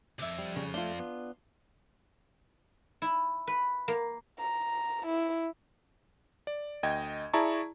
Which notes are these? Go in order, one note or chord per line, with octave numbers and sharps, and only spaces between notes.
C2 F2 D5 E5
G3
C#3
A3 D4 F4 C6
B3
E4
B4
A#3
A#5
E4
D5
D2 D#5 G5 G#6
E4 G#4 D5 A5 A#5 C#6